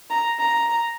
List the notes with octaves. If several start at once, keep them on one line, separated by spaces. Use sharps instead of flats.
A#5
A#5